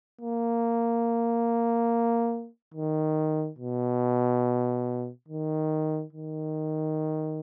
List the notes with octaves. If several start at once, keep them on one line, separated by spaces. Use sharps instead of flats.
A#3
D#3
B2
D#3
D#3